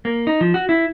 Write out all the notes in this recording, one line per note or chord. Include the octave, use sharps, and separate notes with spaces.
A#3
D#4
F3
F#4
E4